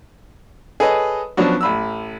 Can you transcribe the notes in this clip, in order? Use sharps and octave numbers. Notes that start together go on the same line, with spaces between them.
G#4 A4 B4 C#5 D#5
F3 F#3 B3 C#4 D4 F#4
A1 B5 E6